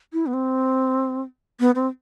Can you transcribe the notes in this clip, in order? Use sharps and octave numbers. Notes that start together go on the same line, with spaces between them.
E4
B3
C4
B3
C4